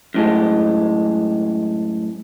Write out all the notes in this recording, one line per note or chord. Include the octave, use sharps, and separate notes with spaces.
F#2 A2 G#3